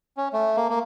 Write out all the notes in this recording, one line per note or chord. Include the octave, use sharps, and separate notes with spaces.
C#4
A3
A#3
A#3